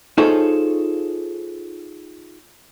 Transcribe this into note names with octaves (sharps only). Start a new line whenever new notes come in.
D#4 F4 G#4 A4 C5 C#5